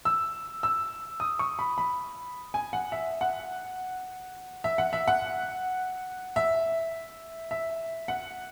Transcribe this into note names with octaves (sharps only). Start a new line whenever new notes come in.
E6
E6
D#6
C#6
B5
B5
G#5
F#5
E5
F#5
E5
F#5
E5
F#5
E5
E5
F#5